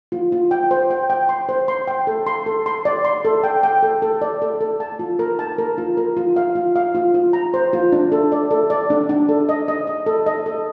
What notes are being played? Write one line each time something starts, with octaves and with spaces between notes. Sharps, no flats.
F4
F4
G5
C5
G5
G5
C6
C5
C6
G5
A4
C6
A4
C6
D5
C6
A4
G5
G5
A4
A4
D5
A4
A4
A5
F4
A#4
A5
A#4
F4
A#4
F4
F5
F4
F5
F4
F4
A#5
C5
F4
D4
A4
D5
A4
D5
D4
D4
A4
D#5
D#5
D#5
A4
D#5
A4